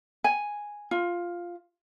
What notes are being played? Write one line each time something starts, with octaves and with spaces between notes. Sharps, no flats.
G#5
F4